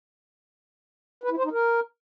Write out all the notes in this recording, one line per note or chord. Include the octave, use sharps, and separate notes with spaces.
B4
E4
C5
D#4
A#4